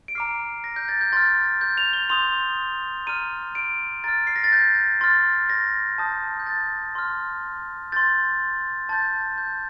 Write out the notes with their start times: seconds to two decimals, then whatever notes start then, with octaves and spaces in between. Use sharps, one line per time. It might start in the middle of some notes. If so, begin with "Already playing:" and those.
0.08 D7
0.15 A#5 D6 F6 C7
0.64 A#6
0.76 G6
0.88 A6
1.01 G6
1.13 C6 F6 A6
1.61 G6
1.78 F7
1.93 G7
2.09 C6 D#6 G6 F7
3.07 A#5 F6 D#7
3.55 D7
4.04 A#5 F6 A6
4.27 C7
4.36 A#6
4.44 A6
4.52 G6
5.01 C6 F6 A6
5.50 A#6
5.98 A5 D#6 G6
6.40 G6
6.46 A6
6.95 C6 F6
7.92 C6 G6 A6
8.89 A5 C6 G6 A6
9.38 G6